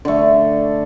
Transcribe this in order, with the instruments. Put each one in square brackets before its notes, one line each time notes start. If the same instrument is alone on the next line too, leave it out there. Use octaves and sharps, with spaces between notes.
[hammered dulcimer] D3 A3